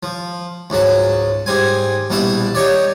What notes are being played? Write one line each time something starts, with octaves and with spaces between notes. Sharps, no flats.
F3
C#2 G#2 F#3 A5
G#2 G3 C4 G#5
A#1 B2 G3 E4 A5
D#4 G4 C#5 D5